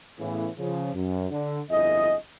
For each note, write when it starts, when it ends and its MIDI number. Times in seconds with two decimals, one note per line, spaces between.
0.19 0.48 45
0.19 0.48 49
0.19 0.48 52
0.19 0.48 59
0.59 0.93 49
0.59 0.93 53
0.94 1.28 42
1.30 1.59 50
1.69 2.14 31
1.69 2.14 41
1.69 2.14 64
1.69 2.14 68
1.69 2.14 75